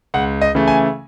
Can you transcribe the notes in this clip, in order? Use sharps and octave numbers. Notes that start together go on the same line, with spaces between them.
C#2 F#5
D#5
C#3 E3 A3
G#5